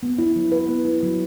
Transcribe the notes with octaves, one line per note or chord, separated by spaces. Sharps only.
B3
E4
F#3
B4
B3
E4
F#3